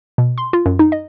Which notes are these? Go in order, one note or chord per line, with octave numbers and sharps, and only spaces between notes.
B2
C6
F4
F#2
D#4
D#5